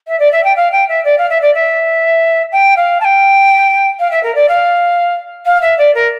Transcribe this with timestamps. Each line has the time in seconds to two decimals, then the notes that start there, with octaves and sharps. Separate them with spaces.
0.08 E5
0.19 D5
0.32 E5
0.44 G5
0.56 F5
0.72 G5
0.89 E5
1.05 D5
1.18 F5
1.30 E5
1.42 D5
1.54 E5
2.52 G5
2.76 F5
3.01 A5
3.04 G5
3.99 F5
4.11 E5
4.23 A#4
4.35 D5
4.48 F5
5.46 F5
5.62 E5
5.78 D5
5.95 A#4